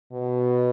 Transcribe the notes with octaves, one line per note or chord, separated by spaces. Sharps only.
B2